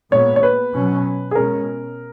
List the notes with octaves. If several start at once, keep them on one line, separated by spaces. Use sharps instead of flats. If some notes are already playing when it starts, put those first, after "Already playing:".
A#2 G#3 B3 C#5
C#5
B4
B2 F#3 C#4
G#4
B2 G#3 C#4 A#4